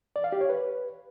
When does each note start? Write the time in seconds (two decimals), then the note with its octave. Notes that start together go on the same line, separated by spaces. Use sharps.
0.16 D5
0.24 F5
0.32 G4
0.41 C#5
0.49 B4